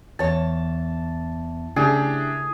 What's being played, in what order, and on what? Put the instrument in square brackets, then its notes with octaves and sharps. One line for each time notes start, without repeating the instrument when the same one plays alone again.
[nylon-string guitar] E2 C#5 [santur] A5
[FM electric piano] C#3 A3 E4 [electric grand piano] D4 G4 [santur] G#4